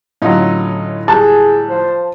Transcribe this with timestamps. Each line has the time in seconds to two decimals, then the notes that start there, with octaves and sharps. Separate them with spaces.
0.22 A2 D3 F#3 C#4 D#4 F4
1.08 G3 G#4 A5 F#6
1.69 F3 C5